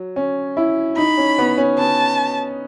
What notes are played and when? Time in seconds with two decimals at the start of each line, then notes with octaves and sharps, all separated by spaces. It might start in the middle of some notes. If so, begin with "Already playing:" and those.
Already playing: F#3
0.16 C#4
0.57 E4
0.97 D#4 B5
1.17 C#4
1.38 B3
1.58 C#4
1.78 B3 A5